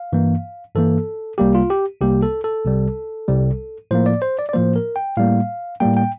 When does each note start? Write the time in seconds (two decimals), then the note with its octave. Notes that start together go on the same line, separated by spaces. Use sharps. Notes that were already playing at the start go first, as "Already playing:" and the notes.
Already playing: F5
0.13 G2 E3 A#3
0.75 G2 E3 A#3 A4
1.38 C2 C3 G3 A#3 G4
1.55 F4
1.70 G4
2.01 C2 C3 G3 A#3 G4
2.23 A4
2.44 A4
2.65 C2 C3 G3
3.28 C2 C3 G3
3.91 A2 F3 A#3 C5
4.06 D5
4.22 C5
4.39 D5
4.49 D5
4.53 A2 F3 A#3 C5
4.76 A#4
4.96 G5
5.17 A2 G3 A#3 F5
5.80 A2 G3 A#3 G5
5.97 G5